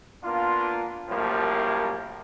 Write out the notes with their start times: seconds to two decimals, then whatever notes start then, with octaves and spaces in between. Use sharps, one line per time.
0.24 A#3 B3 D4 F4
1.09 C2 F#2 A2 F3 G3 A#3